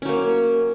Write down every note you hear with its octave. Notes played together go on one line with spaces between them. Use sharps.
F#3 A#3 C#4